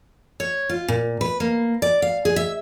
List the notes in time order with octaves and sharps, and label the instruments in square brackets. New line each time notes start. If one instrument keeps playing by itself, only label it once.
[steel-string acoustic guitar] C#5
F4
A#2
B4
A#3
D5
F5
G#4
E5